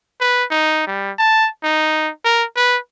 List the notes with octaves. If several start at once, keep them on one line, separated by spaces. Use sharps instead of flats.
B4
D#4
G3
A5
D#4
A#4
B4